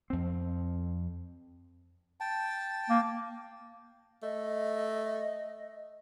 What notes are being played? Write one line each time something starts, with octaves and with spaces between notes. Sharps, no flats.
F2 C4
G5 A5
A#3
A3 D#5